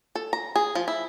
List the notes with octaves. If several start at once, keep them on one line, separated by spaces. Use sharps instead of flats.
A4
A#5
G#4
F3
E4